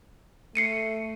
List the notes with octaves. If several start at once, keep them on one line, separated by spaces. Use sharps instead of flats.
A3 C7 C#7 D#7